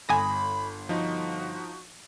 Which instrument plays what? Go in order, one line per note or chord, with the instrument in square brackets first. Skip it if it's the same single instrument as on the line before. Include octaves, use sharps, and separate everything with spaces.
[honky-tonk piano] G1 [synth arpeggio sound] G#5 D#6 A#6 [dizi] B5
[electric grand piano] F3 D#4 [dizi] F#4